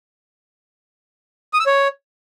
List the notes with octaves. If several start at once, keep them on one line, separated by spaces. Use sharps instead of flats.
D#6
E6
C#5